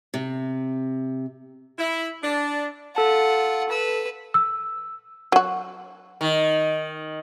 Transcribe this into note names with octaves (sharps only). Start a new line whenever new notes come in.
C3
E4
D4
F4 A4 F#5 A5
B4 E6
E6
F#3 F#4
D#3